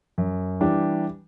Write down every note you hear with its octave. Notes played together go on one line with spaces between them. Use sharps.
F#2
E3 G3 D4 G4